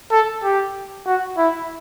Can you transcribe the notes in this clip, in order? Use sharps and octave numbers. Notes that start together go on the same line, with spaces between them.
A4
G4
F#4
E4